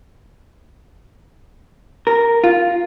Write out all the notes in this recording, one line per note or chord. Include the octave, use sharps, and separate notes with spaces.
A#4
F4